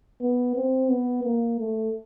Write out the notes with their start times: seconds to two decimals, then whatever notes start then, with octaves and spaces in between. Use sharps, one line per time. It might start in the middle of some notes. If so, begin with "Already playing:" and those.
0.21 B3
0.56 C4
0.89 B3
1.24 A#3
1.59 A3